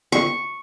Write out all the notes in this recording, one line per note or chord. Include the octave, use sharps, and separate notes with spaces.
C#6